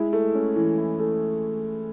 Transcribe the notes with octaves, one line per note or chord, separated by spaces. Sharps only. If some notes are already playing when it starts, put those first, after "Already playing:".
Already playing: G#3 E4
A3
C#4
E3
E4
A3